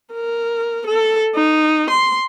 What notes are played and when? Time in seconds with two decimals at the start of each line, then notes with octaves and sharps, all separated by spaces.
0.13 A#4
0.86 A4
1.35 D#4
1.90 C6